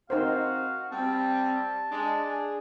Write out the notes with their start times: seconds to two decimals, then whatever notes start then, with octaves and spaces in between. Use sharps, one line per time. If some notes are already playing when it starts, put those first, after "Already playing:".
0.10 C4 D#4 F#4 A#4 C5 F5
0.92 G3 C4 A5
1.91 G#3 D4
2.26 G#4